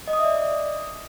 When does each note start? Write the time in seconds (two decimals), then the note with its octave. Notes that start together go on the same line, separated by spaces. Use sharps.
0.08 D#5
0.13 D#6
0.19 E5
0.25 D5